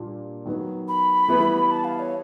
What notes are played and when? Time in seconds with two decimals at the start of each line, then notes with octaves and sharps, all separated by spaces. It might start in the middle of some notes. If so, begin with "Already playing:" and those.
Already playing: A#2 G3 A#3 D4 F4
0.46 D#3 F#3 B3
0.88 B5
1.28 E3 G3 B3 E4
1.71 A5
1.84 F5
1.99 C#5